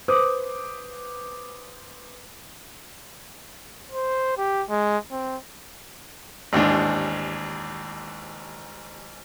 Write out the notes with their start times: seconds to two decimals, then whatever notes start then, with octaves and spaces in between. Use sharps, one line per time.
0.08 B4 C5 D6 D#6
3.92 C5
4.38 G4
4.70 G#3
5.12 C4
6.53 A1 D#2 G#2 D4